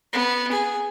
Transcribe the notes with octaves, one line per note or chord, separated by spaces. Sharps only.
B3
G#4